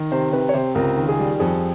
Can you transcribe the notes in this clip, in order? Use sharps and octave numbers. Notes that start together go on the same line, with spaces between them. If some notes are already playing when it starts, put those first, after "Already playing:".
Already playing: D#3
C3 C5
C3 B4
C#5
C3 C5
C#2 A#4
D#3
G#4
G3
F2 G#4